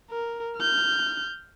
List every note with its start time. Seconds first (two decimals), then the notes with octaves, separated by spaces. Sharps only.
0.11 A#4
0.58 F6 G6